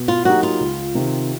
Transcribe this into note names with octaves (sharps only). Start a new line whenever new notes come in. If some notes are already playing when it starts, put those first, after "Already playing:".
Already playing: B2
F4
F#3 A#3 D#4 F#4 G4
F4
C#2
C3 D#3